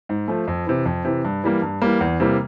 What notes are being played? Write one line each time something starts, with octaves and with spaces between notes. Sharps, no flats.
G#2
F3 A3
F2
C3 E3
F2
C3 E3
G2
E3 G3 A#3
G2
E3 G3 A#3
E2
C3 E3 G3 A#3